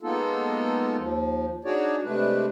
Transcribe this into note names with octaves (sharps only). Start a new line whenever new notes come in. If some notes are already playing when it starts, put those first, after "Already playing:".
G#3 A#3 B3 D#4 F4 A4
D#2 F3
D4 D#4 F#4 G#4 C#5 D5
C3 G#3 A3 D4 B4